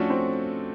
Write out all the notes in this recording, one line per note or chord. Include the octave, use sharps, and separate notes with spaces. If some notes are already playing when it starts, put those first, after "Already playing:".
Already playing: F3 A3 C#4 D4 F#4 A4
C4